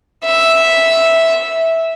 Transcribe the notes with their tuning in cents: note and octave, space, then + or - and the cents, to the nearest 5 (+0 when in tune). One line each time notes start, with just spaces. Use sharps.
E5 -5